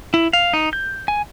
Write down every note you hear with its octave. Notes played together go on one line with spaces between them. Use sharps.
E4
F5
D#4
G6
G#5